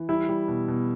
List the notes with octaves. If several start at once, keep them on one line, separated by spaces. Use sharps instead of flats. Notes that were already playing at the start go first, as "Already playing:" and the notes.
Already playing: E3
G3 E4
G3
B2
B2